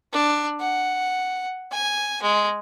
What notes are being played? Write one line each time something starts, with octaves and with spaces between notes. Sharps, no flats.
D4
F#5
G#5
G#3